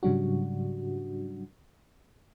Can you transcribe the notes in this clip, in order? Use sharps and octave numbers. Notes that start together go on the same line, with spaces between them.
G#2 C#3 F#3 G3 D4 F#4